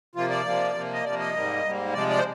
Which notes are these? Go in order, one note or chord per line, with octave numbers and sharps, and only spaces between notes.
C3 F3 A#3 F4
D5
C3 F3 A#3
C3 F3 A#3
D#5
C3 F3 A#3 D5
D#5
G#2 G3 A#3
G#2 G3 A#3
C3 F3 G#3 D5
D5
C5